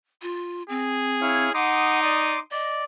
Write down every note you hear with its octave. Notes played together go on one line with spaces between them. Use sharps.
F4
C4 G#4
E4 C#5 F5
D#4 F#5 C6 D6 D#6
D5
D5 D#5